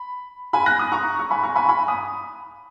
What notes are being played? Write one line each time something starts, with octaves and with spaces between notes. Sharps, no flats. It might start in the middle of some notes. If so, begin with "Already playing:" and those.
Already playing: B5
G#5 B5
F#6 A#6
D#6 F#6
A#5 C#6
C#6
G#5 B5
A#5 C#6
G#5 B5
G#5 B5
B5 D#6